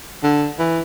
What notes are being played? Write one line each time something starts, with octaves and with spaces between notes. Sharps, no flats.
D3
E3